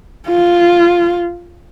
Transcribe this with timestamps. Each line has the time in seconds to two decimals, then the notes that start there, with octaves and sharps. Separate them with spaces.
0.27 F4